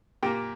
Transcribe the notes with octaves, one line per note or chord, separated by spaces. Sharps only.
A#2 A#3 G4 G5